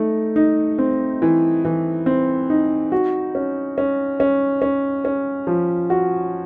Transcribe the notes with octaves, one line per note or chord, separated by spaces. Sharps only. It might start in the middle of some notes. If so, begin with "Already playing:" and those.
Already playing: A3 D#4
D#4
C4
E3
E3
C4
D#4
F#4
C#4
C#4
C#4
C#4
C#4
F3
F#4